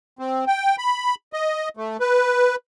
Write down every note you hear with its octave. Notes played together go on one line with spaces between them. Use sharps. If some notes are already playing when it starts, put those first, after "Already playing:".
C4
G5
B5
D#5
A3
B4